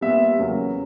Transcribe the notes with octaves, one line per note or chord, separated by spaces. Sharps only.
A#2 G3 B3 E5
E2 C#3 F#3 A#3